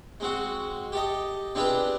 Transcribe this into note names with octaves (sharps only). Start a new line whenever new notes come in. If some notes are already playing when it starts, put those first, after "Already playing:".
G#3 C4 F#4
G4 A4 D#5
C4 D4 F4 G4 G#4 B4